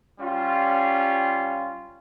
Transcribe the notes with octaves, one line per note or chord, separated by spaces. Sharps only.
G3 C#4 F4